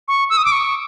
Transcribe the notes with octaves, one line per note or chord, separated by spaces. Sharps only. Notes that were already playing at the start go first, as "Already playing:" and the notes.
C#6
E6
D#6
D6
C#6